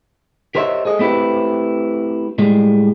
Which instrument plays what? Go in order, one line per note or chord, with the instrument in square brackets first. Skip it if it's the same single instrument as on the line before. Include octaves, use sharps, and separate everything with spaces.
[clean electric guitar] G4 A#4 C5 C#5 D#5 E5
G#4 A4 D#5
A3 C4 E4 G4 B4
A2 G3 G#3